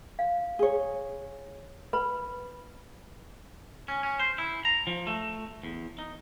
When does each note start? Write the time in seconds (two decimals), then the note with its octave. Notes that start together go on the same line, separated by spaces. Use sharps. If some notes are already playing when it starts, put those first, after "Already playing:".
0.19 F5
0.59 G#4 C#5
1.93 B4 B5
3.88 C#4
4.03 C#4
4.20 C5
4.38 E4
4.65 A#5
4.87 F3
5.07 A3
5.64 E2
5.99 D#4